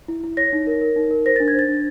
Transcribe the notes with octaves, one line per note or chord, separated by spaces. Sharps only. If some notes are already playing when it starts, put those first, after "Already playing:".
E4
E4
C#5 A#6
D#4
A#4
A#4
D#4
A#4
C5 A#6
D4 A6
G#6
C5 A6
D4